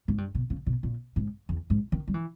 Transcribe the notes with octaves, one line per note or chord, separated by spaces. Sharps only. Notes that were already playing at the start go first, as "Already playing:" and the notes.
G#2
G2
B2
C#3
B2
A#2
G#2
E2
G#2
D#3
G3
E3